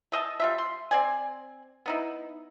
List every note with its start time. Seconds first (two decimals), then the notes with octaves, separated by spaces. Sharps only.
0.12 A3 D#5 E5 A5
0.40 G3 F4 E5
0.58 C6
0.91 C4 D5 G#5
1.86 B3 D#4 E4